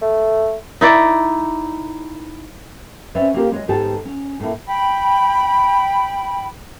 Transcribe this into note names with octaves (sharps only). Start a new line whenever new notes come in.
A3
D#4 E4 D5
C4 C#4 B4 C5 D5 E5
A#3 C4 F4 G4 A4 A#4
G#3 C#5 D#5
G#2 D#3 B3 G4 A4 A5
C#4
A2 A3 A#3 E4
G5 B5